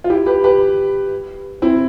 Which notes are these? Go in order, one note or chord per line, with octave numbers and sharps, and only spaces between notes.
F4
E4 G4
G4 B4
G4 B4
C4 E4